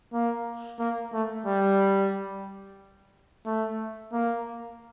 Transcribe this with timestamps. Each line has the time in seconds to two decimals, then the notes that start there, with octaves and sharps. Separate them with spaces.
0.13 A#3
0.80 A#3
1.13 A3
1.46 G3
3.46 A3
4.12 A#3